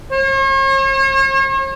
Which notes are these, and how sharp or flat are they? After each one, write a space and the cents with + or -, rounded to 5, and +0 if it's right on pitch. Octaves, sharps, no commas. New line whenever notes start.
C#5 -45